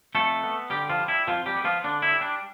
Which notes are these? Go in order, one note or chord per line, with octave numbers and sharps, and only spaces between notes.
F2 A3 A4
B3
D3 G3 G4
F3 F4
G3
E4
F2 F3 F4
G3 G4
B3
F3 F4
D3 D4
E4
G3
D4